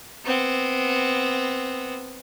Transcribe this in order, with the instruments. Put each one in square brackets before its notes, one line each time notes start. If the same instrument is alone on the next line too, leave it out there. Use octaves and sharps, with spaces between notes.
[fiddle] B3 C4